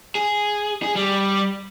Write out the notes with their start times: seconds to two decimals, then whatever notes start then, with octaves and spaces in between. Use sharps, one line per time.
0.15 G#4
0.83 G#4
0.96 G3